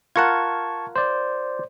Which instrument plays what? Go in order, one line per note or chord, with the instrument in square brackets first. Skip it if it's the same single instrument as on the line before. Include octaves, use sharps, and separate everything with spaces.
[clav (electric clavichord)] F4 A#4 F#5 [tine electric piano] A5 C#6 G#6
[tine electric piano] C5 D5